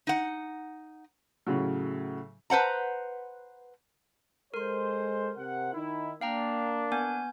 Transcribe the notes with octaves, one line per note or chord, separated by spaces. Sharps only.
D#4 F#5
A2 C#3 F#3
B4 C5 F#5 A#5
G#3 A4 A#4 C5 C6
C3 F#5
D#3 D#4 E4
A#3 D4 F5 G5 A#5
B3 G#5 G6